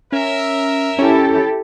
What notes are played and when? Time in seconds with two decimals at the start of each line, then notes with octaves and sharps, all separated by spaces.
0.12 C#4 A#4 E5
0.99 C#4 E4 G4 A4